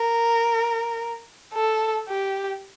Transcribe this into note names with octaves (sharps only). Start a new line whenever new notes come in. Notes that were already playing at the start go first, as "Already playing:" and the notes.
Already playing: A#4
A4
G4